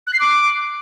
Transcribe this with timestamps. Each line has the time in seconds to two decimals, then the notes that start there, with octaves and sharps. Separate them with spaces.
0.07 F#6
0.13 C7
0.19 D6